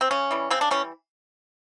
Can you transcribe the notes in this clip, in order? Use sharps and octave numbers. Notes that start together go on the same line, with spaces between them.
C4
C#3 C#4
E3 G3
C#3 C4
D4
E3 G3 C#4